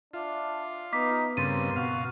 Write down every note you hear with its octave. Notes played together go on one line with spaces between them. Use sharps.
D4 F4 E5 D6
B3 D#4 B4 D6 B6
G2 C#3 A#3 C4 C6 A6 D#7
B2 F#4 F5